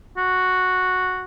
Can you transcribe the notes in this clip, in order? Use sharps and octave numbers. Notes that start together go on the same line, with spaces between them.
F#4